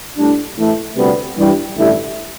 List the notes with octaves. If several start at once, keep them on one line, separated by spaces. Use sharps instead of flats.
A2 G3 D4
A2 E3 A3
D2 C3 G3 B3
G2 E3 G3
A1 G2 D3 A3 E4